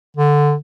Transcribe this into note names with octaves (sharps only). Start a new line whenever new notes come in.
D3